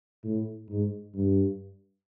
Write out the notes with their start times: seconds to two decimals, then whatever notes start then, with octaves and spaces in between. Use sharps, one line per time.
0.24 A2
0.69 G#2
1.14 G2